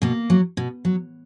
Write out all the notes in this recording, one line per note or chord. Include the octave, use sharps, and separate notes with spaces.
B2 A#3
F#3
B2
F#3